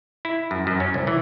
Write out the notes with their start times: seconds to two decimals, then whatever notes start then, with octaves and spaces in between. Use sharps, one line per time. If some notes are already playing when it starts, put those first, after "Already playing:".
0.25 E4
0.51 F#2
0.67 F#2
0.80 C#4
0.94 C2
1.07 E3